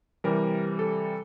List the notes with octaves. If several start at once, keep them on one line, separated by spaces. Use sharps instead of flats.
C3 E3 G3 A#4
A4